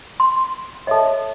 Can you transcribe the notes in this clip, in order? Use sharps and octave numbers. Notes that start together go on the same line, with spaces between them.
C6
A4 C#5 D#5 E5 A5